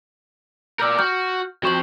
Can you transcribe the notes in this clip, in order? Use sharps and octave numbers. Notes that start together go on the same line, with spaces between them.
A#4 D5 E6 F6 G6
F#4 F6 G6
F2 F#4 C5 C#6 F#7